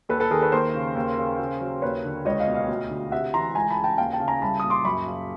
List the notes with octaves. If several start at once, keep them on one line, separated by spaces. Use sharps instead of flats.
D#2 A4 B4
A4 B4
D#3 G#4 A#4
A4 B4
D#2 A#4 C5
C#3
D#2
C#3
C#3
F#3
D#2 B4 C#5
D3
C#2 C#5 D#5
D#5 F5
B2
D#5 F5
D2
D3
C3 E5 F#5
E3 A#5 C6
C#2 G#5 A#5
A5 B5
C#3
G5 A5
D#2 F5 G5
G5 A5
C#3
G#5 A#5
C2 A5 B5
A#2 D#6
C6 D6
F#2 B5 C#6
C#3